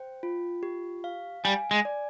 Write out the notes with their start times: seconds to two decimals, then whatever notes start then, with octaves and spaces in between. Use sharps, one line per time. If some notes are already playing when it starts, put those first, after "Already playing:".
Already playing: C5 G5
0.23 F4
0.63 G4
1.04 F5
1.44 G3 G#5
1.71 G#3
1.85 D5